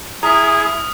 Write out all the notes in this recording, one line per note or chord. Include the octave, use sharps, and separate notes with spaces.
E4 G#4 A#5 D#6 F6 B6